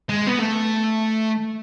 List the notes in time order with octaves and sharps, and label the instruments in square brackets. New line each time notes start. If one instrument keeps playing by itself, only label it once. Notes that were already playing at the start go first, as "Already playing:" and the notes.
[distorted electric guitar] G#3
B3
A3